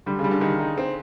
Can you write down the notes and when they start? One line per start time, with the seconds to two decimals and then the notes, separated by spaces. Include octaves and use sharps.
0.06 D3 G3
0.19 C#3
0.24 G3
0.31 D3
0.41 D#3
0.59 D#4
0.78 C4